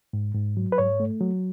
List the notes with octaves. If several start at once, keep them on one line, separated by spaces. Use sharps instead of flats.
G#2
G#2
F#3
B4
G#2 C#5
A3
F#3